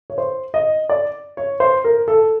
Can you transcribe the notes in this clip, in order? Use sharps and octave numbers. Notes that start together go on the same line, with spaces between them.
C#5
C5
D#5
D5
C#5
C5
A#4
A4